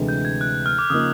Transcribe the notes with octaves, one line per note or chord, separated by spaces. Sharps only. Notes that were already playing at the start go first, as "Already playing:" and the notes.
Already playing: D2 C3 E3 G#3
G6
G#6
F#6
F6
D6
C#3 F3 A#3 D#4 D#6